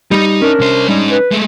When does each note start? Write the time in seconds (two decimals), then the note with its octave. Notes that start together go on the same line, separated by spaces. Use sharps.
0.11 G3 D#4
0.41 C#4 D4 A#4
0.59 C2 C5
0.88 G3 G#3 D#4
1.10 B4
1.32 G#3 A3